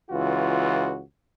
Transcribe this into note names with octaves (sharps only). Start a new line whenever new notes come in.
C#2 E3 F4 F#4